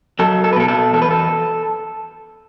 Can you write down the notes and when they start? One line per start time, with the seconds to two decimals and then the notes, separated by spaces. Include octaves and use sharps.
0.19 F#3 A4
0.44 A4
0.53 B4
0.57 B2 A4
0.68 A4
0.93 E2 A4
1.02 B4
1.11 A4